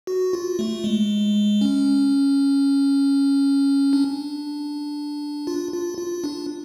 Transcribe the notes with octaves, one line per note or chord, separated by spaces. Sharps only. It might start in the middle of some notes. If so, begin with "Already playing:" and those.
F#4
F4
A3
G#3
C#4
D4
F4
F4
F4
D4